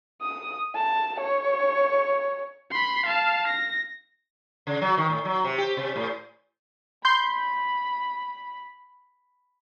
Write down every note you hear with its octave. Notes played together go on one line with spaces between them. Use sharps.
D#6
A5
C#5
B5 C6
F5 A5
A#6
C#3
F#3
D#3
A2
F#3
C3
G4
C3
A2
B5 C6 G6